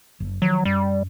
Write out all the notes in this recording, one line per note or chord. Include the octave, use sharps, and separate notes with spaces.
F#1
D#3 F3 F#3
F#2 G3